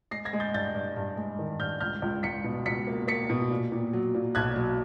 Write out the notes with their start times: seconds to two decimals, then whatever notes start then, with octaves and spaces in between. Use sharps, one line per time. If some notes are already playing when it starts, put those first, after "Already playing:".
0.11 G#3 A#6 C7
0.25 G#6 A#6
0.33 G#3
0.40 G6 A6
0.54 G2 G6 A6
0.75 G2
0.96 G2
1.17 G#3
1.39 D#3
1.60 G2 F6 G6
1.80 C#2 F6 G6
2.02 C#2
2.23 C#2 B6 C#7
2.44 B2
2.66 C#2 B6 C#7
2.87 A#3
3.08 A#3 B6 C#7
3.29 B2
3.51 A#2
3.72 A#2
3.93 F#3
4.15 A#2
4.35 B1 F#6 G#6
4.56 F#3